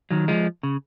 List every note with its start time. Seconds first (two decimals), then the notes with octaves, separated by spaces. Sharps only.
0.11 D#3 F#3
0.28 F3 G#3
0.63 C#3